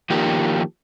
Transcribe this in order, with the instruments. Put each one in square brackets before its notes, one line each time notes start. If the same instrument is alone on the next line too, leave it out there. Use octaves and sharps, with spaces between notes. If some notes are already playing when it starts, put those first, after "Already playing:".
[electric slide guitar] D#3 F3 A#3 G4